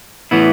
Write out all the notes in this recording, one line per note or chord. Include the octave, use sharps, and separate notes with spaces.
A2 E3 B3 E4